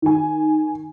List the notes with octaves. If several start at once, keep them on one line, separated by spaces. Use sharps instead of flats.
D#3 G#5